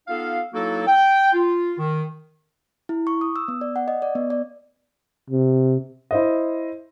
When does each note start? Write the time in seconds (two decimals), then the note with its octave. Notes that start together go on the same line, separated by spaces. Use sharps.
0.08 B3 D#4 F4 A4 F5
0.54 F#3 A#3 D#4 E4 F#4 A4
0.87 G5
1.34 F4
1.78 D#3
2.89 E4
3.07 C#6
3.21 D#6
3.36 E6
3.48 B3
3.61 D5
3.76 F#5
3.88 D#5
4.02 D5
4.15 B3
4.30 D5
5.30 C3
6.11 E4 C5 D#5